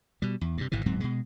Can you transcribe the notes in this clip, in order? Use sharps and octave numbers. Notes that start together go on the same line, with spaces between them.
B2 G3
E2
G2 C3
G#1 G#2 B2 E3
D1 G#2 F#3 C4
B2 G#3